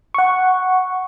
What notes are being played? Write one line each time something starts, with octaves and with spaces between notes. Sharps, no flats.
F#5 C#6